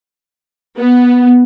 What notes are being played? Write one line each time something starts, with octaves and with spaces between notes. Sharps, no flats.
B3